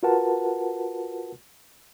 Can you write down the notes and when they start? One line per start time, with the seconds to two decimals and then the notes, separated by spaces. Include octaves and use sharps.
0.03 F4 F#4 A#4 B4 F#5 A5